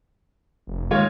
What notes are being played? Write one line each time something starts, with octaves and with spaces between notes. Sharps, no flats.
F1
D#2 G#3 F4 C#5